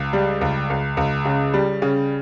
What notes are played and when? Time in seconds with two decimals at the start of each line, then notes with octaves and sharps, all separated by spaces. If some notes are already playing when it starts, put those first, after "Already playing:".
Already playing: C#2
0.13 G3
0.41 C#2
0.70 C#2
0.97 C#2
1.25 C#3
1.54 G3
1.82 C#3